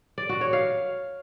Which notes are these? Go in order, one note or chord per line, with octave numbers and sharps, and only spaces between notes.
D5
F#4
C#5
F5